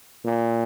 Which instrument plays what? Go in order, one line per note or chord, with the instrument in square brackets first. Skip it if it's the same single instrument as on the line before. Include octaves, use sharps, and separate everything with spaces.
[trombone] A#2